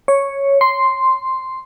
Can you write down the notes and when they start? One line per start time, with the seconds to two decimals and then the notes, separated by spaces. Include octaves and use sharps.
0.08 C#5
0.61 C6